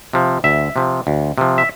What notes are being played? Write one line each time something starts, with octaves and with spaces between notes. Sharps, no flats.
C3 F3
D2 E5
C3 F3
D2
C3 F3
E5